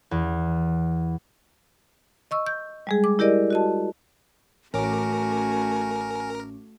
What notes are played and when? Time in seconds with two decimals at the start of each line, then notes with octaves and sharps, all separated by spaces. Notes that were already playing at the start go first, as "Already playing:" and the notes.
0.11 E2
2.31 D#5 C#6 E6
2.47 G6
2.87 G3 G#3 G#4
3.04 D6
3.19 E4 G4 A#4 D5 D#5
3.50 F#4 D#5 A5
4.74 A1 A3 C#4 F#4 A#4 G#5 D6